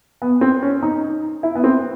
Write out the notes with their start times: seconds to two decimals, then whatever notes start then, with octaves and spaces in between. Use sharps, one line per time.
0.22 B3
0.41 C4
0.62 C#4
0.83 D#4
1.43 E4
1.55 B3
1.64 C4